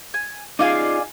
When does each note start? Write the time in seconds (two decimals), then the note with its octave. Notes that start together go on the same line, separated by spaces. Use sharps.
0.14 G#5
0.59 D#4 F4 G#4 D5 F5 G#5